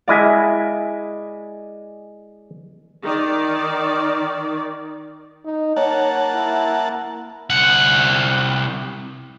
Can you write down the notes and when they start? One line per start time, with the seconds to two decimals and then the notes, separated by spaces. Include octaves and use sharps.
0.08 G#3 E4 D5 D#5 F5 G#5
3.03 D#3 D5
5.45 D#4
5.76 A#3 C#5 F#5 A5
6.34 E4
7.50 C2 F#5